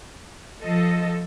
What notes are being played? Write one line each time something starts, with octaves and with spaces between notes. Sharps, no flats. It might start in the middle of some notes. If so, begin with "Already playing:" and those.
F3 A4 D#5